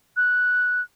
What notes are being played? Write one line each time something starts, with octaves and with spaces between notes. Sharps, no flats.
F#6